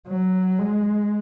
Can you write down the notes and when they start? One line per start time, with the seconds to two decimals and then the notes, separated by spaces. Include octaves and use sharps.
0.08 F#3
0.59 G#3